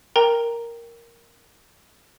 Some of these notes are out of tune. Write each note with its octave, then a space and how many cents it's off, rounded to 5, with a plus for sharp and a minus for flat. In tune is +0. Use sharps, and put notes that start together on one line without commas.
A#4 +0 G5 +10 A#5 +0